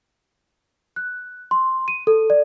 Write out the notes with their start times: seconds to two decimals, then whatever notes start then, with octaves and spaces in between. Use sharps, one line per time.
0.96 F#6
1.51 C6
1.88 D#7
2.07 A4
2.30 D5